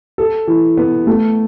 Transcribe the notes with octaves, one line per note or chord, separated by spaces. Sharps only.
A4
E3
B3
A3